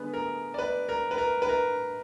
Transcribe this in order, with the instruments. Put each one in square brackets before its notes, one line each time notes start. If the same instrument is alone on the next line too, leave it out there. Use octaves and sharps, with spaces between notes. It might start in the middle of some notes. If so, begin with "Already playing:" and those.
Already playing: [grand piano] D3 G#3 B3 B4
A#4
D5
B4
A#4
B4
A#4
B4
A#4